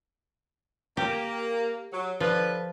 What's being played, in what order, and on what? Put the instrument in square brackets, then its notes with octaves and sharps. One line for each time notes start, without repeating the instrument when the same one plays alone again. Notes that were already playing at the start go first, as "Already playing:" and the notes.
[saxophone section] A#3 [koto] G4
[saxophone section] F#3
[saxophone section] D3 B4 [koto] F3